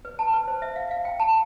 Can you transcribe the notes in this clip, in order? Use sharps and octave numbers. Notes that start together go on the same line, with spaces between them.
B4
A5
B4
C5
E5
F5
F5
G5
A5